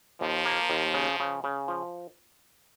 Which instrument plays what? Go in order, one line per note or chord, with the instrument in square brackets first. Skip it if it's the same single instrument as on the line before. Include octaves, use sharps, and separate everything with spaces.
[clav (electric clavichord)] D#2 [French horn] F3
[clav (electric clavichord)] A#3
D#2
C#3
C#3
C#3
F3